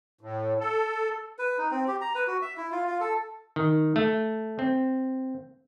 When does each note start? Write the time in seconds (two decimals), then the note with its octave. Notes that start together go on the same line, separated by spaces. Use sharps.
0.21 A2
0.60 A4
1.39 B4
1.58 D#4
1.71 C4
1.88 G4
2.01 A#5
2.15 B4
2.27 F#4
2.42 E5
2.57 E4
2.72 F4
2.87 F4
3.00 A4
3.56 D#3
3.96 A3
4.59 C4